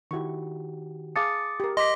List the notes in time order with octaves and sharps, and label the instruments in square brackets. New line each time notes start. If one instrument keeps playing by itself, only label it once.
[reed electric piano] D#3 F#4 G4 [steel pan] E4 C#6
[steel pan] G#4 F5 A5 [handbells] D6 A6 C#7 [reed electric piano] D#6
[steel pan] G4 A#4
[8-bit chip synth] D#5 [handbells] C6 D6 B6